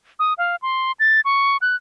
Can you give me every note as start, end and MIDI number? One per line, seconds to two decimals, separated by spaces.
0.19 0.34 87
0.38 0.56 77
0.62 0.92 84
1.00 1.21 93
1.25 1.57 85
1.62 1.76 90